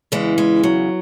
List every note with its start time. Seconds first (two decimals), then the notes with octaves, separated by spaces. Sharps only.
0.12 E2 C#3 E3 G#3
0.38 G#3
0.63 F#3